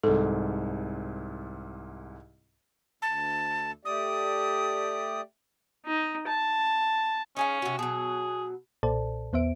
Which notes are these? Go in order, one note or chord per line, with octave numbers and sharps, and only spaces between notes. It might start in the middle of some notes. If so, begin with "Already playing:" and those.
C2 G#2 A4
D2 A5
A3 G4 D5 D#6
D#4
A5
C#4 D#4 G#4 F5
C3 F#4
B2 F#3 G#4
B1 A#2 A4 C5 D5 A5
E2 B3 C5 E5 D7